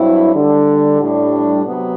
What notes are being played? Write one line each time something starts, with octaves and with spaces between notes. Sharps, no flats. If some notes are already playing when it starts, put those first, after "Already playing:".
Already playing: G2 F#3 C4 E4
D3 G3 D4
A2 G3 D4
C3 F#3 B3